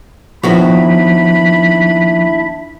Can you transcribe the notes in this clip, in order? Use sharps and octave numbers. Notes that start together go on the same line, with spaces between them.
D#2 F3 B3 D4 E4 F#4 E5 B5